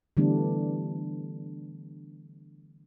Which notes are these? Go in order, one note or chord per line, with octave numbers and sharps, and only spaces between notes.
D3 E3 G3 A3 B3 D4